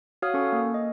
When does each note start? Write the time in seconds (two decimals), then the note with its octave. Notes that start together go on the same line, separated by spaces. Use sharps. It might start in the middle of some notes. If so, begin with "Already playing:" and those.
0.22 F#4 C#5 F5 D#6 F6
0.34 C#4 A4 C#6
0.52 A#3
0.74 D#5